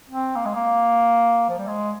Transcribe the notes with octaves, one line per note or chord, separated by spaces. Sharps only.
C4
A#3
G#3
A#3
F3
G3
G#3